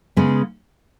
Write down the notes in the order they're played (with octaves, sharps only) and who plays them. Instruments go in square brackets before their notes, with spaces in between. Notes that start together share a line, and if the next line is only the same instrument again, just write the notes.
[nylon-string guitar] C#3 G#3 B3